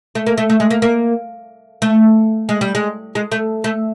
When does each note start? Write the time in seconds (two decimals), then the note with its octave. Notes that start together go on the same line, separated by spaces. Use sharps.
0.15 A3
0.27 A#3
0.38 A3
0.50 A3
0.60 G#3
0.71 A#3
0.82 A#3
1.82 A3
2.49 G#3
2.61 G3
2.75 G#3
3.15 G#3
3.32 A3
3.64 A3